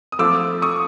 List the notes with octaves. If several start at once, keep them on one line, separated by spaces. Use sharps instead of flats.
D#6
F3 A3 C4 F4 D6 E6
C#6 D#6